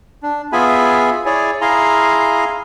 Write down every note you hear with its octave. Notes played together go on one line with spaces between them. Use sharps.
D4
B3 F4 G#4 E5 G#5 B5
E4 G#4 C#5 D5 G#5
E4 G#4 F5 G#5 A#5 C6